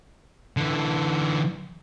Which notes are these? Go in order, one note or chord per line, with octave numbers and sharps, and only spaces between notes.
D3 E3